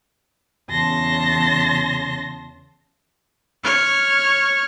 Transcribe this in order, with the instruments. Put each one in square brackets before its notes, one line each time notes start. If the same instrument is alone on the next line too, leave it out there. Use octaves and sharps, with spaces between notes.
[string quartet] E2 C#3 A5 C6 A#6
[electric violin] C#5 F6